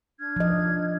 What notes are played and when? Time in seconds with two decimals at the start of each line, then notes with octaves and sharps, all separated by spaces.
0.20 D4 F6 G#6
0.36 F3 D#5